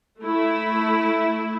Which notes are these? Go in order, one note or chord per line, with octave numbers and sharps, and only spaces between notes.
A3 E4